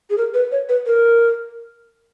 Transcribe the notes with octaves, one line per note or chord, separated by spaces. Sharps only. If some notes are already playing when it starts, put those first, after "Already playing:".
G#4
A#4
B4
C#5
B4
A#4